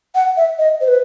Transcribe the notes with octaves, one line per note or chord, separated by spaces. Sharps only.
F#5
E5
D#5
C5
B4